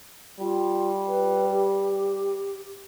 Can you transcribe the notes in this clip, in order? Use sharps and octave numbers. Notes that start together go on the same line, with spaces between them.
G3 F4
B4
G4